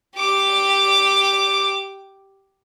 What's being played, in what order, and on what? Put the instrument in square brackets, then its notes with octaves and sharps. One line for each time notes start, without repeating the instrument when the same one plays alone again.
[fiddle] G4 D6